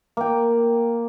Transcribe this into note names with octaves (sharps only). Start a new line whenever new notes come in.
A#3 G5